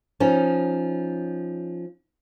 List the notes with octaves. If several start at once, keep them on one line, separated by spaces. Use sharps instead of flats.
F3 C#4 D#4